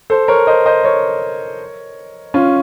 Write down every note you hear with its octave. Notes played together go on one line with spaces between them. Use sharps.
A4 C5
A#4 C#5
C5 D#5
C5 D#5
A#4 C#5
C#4 F4